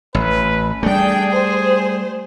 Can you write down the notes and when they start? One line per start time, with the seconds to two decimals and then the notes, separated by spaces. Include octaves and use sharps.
0.15 A1 B4
0.83 G3 A3 D4 G#4 G5
1.32 C5